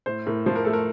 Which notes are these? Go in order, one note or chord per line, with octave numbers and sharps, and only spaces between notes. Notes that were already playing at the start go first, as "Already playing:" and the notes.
A2 C5
A2 A#4
F3 C5
A#4
A3 A4
A#4